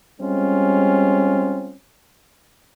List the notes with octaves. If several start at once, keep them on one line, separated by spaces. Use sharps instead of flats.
G3 G#3 C4 C#4 F4